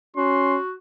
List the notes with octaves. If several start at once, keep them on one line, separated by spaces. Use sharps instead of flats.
C#4 F#4 C6